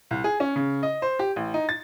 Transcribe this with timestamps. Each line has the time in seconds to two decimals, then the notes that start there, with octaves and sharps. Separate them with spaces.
0.11 C2
0.24 G#4
0.40 C#4
0.56 C#3
0.83 D#5
1.02 C5
1.19 G4
1.36 A1
1.54 D#4
1.69 A6